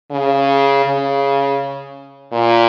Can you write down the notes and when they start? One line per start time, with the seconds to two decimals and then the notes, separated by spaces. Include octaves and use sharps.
0.11 C#3
0.85 C#3
2.33 A#2